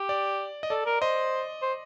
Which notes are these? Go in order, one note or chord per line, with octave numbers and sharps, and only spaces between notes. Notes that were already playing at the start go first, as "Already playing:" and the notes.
Already playing: G4
D5
D#5
A4 D5
A#4
C5 D#5
C5